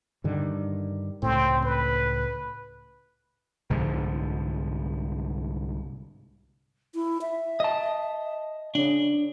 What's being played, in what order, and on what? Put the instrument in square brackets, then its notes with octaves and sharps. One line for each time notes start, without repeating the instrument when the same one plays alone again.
[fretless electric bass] G2 D3 D#3
[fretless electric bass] C#2 A2 [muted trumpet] C4
[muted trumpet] B4
[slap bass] C2 G#2 D3 F3
[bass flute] E4
E5
[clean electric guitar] D#5 A5
[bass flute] C#3 [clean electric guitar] D4